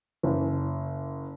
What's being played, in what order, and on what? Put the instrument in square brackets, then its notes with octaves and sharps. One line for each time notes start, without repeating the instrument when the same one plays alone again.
[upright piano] F#1